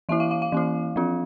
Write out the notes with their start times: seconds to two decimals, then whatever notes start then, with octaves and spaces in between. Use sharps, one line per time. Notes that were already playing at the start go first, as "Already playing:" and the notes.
0.09 E3 A#3 E4 E5
0.20 F5
0.31 F5
0.42 F5
0.52 E3 A#3 E4
0.96 F3 C4 F4